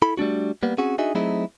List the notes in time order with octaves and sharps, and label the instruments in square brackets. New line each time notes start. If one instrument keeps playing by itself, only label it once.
[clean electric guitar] E4 A4 B5
G3 A3 D4 F#4
G3 A#3 B3
C4 C#4 F#4 G#4
D4 D#4 F#4 G#4 D#5 E5
F#3 A3 C4 D#4 E4 G#4